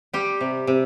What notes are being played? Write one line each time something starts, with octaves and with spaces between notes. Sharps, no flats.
G3 G4
C3
C3